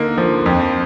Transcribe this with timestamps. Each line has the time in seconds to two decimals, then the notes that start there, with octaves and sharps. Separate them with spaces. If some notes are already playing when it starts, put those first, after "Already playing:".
Already playing: D3 A#3 D#4
0.18 F3
0.46 F2